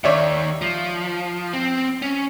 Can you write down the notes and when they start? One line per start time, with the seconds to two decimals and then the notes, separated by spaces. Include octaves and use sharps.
0.04 D#2 D#3 C#5 D5 E5
0.62 F3
1.53 C4
2.02 C#4